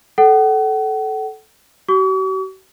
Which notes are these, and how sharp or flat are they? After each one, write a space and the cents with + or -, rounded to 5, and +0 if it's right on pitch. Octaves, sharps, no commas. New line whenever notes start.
A4 -15 F#5 +40
F#4 +45 C#6 +45